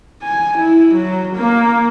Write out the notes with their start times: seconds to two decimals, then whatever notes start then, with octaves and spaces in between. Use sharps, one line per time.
0.23 G#5
0.59 E4
0.96 F#3
1.36 A#3